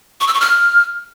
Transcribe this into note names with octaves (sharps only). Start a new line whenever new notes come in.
C#6
E6
C#6
F6